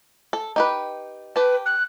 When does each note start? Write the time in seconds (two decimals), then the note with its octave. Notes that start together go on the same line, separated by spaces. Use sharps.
0.33 A4
0.56 D#4 G4 B4
1.36 G4 B4 A5
1.66 F#6